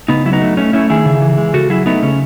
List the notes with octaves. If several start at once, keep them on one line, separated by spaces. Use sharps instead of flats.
C#3 B3 D#4
F#3 E4
B3 D#4
A3
A3 C#4
A3 C#4 E4
D#3 E4 G#4
C#3
E3
G#3
C#3 F#4 A4
F#3 E4 G#4
A3 B3 D#4
C#3 C#4